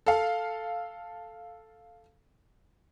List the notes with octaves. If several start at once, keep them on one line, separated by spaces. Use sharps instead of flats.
A4 F5